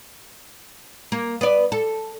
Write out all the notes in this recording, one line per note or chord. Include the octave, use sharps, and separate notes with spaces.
A#3
B3 D5
A4